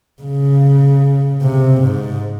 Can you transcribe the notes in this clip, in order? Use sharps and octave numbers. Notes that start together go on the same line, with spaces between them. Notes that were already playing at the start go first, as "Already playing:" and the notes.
C#3
C3
G#2